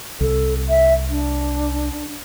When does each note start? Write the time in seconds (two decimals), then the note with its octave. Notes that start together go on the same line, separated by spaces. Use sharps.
0.21 C2 A4
0.69 E5
1.10 D4